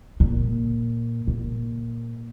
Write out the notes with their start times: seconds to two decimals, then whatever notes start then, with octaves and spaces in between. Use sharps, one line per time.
0.20 A#2
1.27 A#2